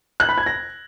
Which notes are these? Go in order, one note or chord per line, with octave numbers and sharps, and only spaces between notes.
F#6
B5
G#6
A#6